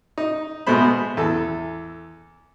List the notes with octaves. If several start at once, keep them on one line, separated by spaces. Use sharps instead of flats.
D#4
B2 G#3 A3 B3 C5 B5
E2 A4